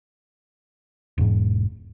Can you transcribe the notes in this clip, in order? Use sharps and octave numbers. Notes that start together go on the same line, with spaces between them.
E1 G#2